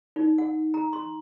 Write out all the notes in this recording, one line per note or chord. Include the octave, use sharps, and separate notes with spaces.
D#4
F#5
A#5
C6